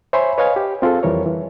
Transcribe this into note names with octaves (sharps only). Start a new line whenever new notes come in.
C5 C#5 E5 G#5 B5 C6
B4 C#5 D#5 F5 G#5
G4
C4 F4 G#4 A4
F2 E3 G3 A#4 C#5
E3